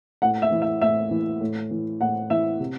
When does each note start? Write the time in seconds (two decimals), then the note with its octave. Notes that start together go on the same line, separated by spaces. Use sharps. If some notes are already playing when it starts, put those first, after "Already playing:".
0.22 A2 F#5
0.42 E5
0.52 E3
0.62 E5
0.81 A2 E5
1.11 E3
1.41 A2
1.71 E3
2.01 A2 F#5
2.30 E3 E5
2.60 C3